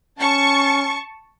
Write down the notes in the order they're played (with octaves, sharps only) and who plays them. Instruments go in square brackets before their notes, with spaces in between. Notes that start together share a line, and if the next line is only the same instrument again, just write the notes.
[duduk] C#4 [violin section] A5 C#6